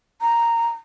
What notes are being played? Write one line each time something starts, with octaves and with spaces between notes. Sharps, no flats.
A#5